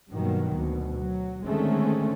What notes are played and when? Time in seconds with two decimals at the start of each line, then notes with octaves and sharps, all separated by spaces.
0.11 G2 B2 D#3 F#3 A#3
0.58 D2 B2
0.99 F#3
1.45 D3 D#3 G#3 A3 C4 C#4